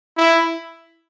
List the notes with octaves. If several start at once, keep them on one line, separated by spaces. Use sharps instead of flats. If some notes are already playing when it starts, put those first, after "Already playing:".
E4